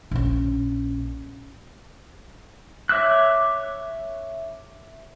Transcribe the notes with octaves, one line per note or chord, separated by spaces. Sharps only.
A#1 C#4
C#5 E5 D6 E6 F#6